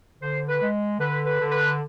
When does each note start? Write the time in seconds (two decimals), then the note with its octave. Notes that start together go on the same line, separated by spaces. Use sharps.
0.21 D3 C5
0.48 B4
0.61 G#3
0.99 D3 B4
1.26 B4
1.38 D3
1.51 B4